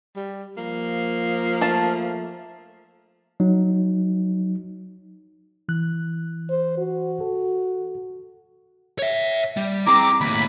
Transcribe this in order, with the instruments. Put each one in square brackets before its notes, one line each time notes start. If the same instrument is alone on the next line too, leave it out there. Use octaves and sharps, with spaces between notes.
[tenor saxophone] G3
[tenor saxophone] F3 [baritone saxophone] A#3
[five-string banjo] A3 A5
[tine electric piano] F#3 D#4
[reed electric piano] E3 F#6
[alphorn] C5
F#4
[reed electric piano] A4
[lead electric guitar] C#5 E5
G3
[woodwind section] C4 A#5 D6 [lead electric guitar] E4 G#4
[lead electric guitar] D#2 A2 [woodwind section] B5